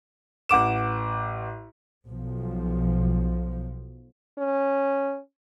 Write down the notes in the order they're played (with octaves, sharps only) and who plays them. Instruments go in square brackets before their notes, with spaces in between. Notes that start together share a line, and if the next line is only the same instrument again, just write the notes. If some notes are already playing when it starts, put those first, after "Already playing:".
[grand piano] A1 F#5 D6 E7
[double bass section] B1 F3
[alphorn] C#4